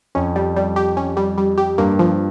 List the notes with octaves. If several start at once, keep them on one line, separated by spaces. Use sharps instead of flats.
F2 C#4
G3
G3
G4
C#4
G3
G3
G4
G2 A#3
F3